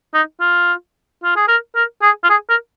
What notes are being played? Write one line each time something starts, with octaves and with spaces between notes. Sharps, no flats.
D#4
F4
F4
G#4
A#4
A#4
G#4
F4
G#4
A#4